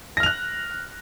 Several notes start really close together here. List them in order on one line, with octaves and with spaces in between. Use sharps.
A#6 F6 F7 F#6